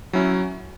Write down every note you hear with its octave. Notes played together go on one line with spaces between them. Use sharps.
F#3 C#4 E4